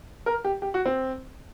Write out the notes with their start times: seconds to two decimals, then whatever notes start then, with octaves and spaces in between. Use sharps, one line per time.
0.26 A#4
0.44 G4
0.62 G4
0.74 F#4
0.85 C4